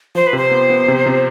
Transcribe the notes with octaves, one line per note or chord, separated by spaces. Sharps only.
F3 C5
B4
C3 C5
B3
B3
C3
C3